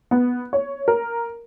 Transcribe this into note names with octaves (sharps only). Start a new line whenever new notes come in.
B3
C#5
A#4